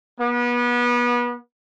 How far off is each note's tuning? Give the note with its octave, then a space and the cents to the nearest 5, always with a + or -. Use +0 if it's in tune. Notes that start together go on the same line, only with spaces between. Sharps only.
B3 -30